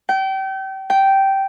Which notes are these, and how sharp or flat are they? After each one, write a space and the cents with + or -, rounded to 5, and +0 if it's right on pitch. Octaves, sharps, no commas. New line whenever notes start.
G5 -30
G5 -10